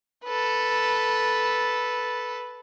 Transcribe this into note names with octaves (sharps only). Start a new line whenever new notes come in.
A4 B4